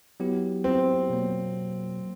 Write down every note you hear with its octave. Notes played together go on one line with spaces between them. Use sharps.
F#3 B3 E4 G4
C4
B2 F#3 A#3